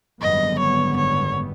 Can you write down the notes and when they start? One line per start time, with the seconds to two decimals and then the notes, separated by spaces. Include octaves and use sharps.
0.21 G#1 F#2 D3 G3 B3 D#5
0.60 C#5
0.97 C#5